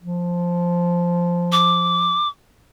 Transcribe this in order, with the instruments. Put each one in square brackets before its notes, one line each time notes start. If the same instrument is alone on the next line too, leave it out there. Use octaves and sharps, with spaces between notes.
[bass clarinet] F3
[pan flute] D6